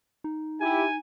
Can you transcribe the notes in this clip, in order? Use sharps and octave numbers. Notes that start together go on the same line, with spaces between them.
D#4
E4 G4 G#5